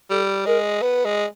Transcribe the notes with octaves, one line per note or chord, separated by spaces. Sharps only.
G3 A4
G#3 A#4
B3 B4
G#3